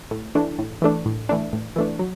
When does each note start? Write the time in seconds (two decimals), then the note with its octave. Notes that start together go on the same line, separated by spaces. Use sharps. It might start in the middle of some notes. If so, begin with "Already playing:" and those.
0.11 A2
0.35 E3 A3 D4
0.59 A2
0.82 E3 A3 D4
1.06 A2
1.29 E3 A3 D4
1.53 A2
1.76 E3 A3 D4
1.99 F#3